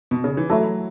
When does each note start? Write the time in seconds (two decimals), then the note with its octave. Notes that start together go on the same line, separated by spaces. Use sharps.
0.11 B2
0.24 C#3
0.37 E3
0.50 F#3 A3 E4 A4